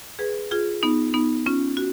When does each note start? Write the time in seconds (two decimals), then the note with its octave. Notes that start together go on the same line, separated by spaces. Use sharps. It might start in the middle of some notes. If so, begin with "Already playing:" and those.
0.19 G#4 B4
0.51 F4 G#4
0.83 B3 D#4
1.14 B3 D#4
1.46 C#4 F4
1.77 F#4